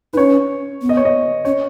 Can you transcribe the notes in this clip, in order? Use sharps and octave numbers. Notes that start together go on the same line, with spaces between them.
D#4 B4
C#4 C#5
B3
D#5
C#5
D#5
C#4 C#5